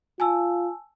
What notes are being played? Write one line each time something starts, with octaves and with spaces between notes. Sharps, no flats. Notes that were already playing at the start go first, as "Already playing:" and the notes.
F4 G#5 A5 E6